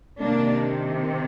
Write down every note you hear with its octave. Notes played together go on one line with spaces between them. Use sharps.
C3 D#3 A#3 D4